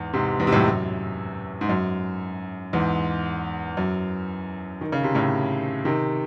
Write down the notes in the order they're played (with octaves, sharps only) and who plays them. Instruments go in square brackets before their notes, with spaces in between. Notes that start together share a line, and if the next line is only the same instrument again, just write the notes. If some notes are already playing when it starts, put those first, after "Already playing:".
Already playing: [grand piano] E2 G#2
G#2 C3
E2 G#2
C3
F#2 A2
F#2
G#2
F#2
E2 G#2
F#2
D#3
C#3
C3
A2 C#3
C3 D#3